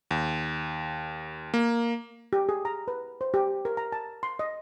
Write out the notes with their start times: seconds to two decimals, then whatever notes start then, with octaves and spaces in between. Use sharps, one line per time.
0.11 D#2
1.54 A#3
2.33 G4
2.49 G#4
2.65 A#5
2.88 B4
3.21 C5
3.34 G4
3.65 A#4
3.77 A#5
3.92 A5
4.23 C6
4.39 D#5